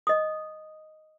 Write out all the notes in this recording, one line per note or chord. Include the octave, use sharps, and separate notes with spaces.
D#5 D#6